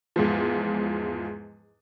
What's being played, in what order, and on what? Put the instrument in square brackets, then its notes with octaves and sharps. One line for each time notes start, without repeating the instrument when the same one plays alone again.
[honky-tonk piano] E2 G#2 F3